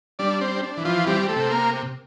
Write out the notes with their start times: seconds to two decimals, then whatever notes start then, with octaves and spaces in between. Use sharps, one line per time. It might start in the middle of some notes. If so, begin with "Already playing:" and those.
0.19 G3 D4 D5
0.41 C4 C5
0.48 D4
0.63 D4
0.77 E3
0.85 F3 F4
1.07 G3 C4 G4
1.29 A3 A4
1.36 C3
1.51 A#3 A#4